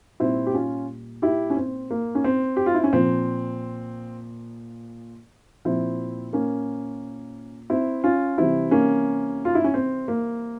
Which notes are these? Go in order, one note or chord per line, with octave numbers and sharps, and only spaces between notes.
A#2 G3 C4 E4
G4
C#4 F4
E4 G4
C#4
C4
A#3
C#4
C4
G4
F4
E4
C#4
A#2 F3 C4
A#2 F3 C4 E4
A#3 C#4
C4 E4
C#4 F4
C3 E3 G3 C4 E4
A#3 C#4
F4
E4
C#4
C4
A#3